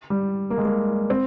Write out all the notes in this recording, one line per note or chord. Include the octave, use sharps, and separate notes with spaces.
G3
A#3
G#3
A#3
C4